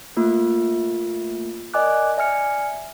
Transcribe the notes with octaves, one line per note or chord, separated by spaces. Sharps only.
A3 A#3 F4
A#4 D5 D#5 G#5 D6 F#6
D5 E5 G#5 F6 C#7